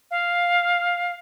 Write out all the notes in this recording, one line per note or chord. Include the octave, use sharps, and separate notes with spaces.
F5